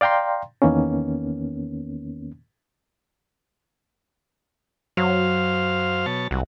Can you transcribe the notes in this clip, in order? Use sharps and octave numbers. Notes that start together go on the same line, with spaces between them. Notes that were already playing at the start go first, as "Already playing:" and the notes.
D5 F5 G5 A#5 C6
E2 D#3 A#3 B3 C#4
F#2 F#3 C5 F5
B2 C#5 A5
C2 F#3